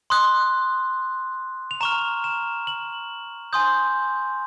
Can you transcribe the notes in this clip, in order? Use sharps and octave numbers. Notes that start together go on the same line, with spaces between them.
C6 D#6 F#6
F7
A#5 C#6 F6 E7
E7
F#7
G#5 C6 D#6 G6